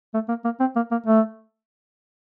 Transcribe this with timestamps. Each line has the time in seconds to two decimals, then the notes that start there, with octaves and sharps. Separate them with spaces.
0.14 A3
0.29 A#3
0.45 A#3
0.60 C4
0.76 A#3
0.91 A#3
1.06 A3